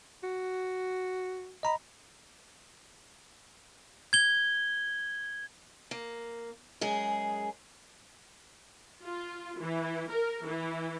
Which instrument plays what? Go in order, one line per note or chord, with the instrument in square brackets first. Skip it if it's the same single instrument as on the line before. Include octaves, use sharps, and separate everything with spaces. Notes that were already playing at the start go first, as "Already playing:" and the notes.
[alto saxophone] F#4
[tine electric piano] D#5 A#5 B5
[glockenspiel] G#6 G7
[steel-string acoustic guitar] A#3
F#2 G#3 G#4
[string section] F4
E3
A#4
E3